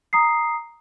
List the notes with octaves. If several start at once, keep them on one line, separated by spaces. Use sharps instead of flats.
A#5 D#6 C7